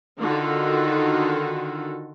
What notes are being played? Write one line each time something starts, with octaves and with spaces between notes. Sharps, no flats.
D3 D#3 D#4 F4 F#4 A4